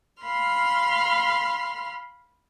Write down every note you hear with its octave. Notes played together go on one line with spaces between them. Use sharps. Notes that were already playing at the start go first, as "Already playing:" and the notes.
F5 B5 C6 F6